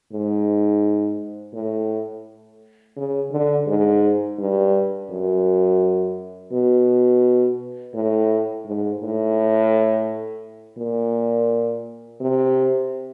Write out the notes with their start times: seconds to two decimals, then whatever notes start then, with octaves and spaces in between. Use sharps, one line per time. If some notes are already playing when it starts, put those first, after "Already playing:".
0.13 G#2
1.54 A2
2.97 C#3
3.31 D3
3.67 G#2
4.39 G2
5.10 F#2
6.52 B2
7.94 A2
8.65 G#2
9.01 A2
10.78 A#2
12.21 C3